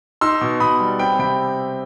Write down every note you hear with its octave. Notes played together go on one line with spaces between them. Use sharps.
D#4 C6 E6
B2
B2 B5 D#6
G3
C4 G5 B5
C3 G5 B5